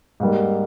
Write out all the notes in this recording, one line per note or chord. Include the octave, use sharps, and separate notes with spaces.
G#2 G3 A#3